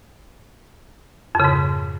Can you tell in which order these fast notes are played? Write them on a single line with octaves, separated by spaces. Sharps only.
F2 C#3 G#2